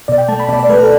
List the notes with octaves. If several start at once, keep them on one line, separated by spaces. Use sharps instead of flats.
B2 D5
G5
A3 A5
B5
B2 D5
D5
A3 B4
A4